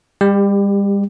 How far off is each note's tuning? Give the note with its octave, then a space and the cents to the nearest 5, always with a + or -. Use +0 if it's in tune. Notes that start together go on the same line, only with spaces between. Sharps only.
G3 +35 G4 +10